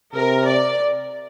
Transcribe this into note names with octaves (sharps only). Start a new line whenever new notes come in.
C3 A#4
D5